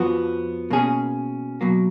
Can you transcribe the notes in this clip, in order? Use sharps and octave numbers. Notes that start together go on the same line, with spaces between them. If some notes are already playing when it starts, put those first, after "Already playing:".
Already playing: F2 F3 B3 F#4
B2 A#3 C#4 G#4
B2 F#3 A#3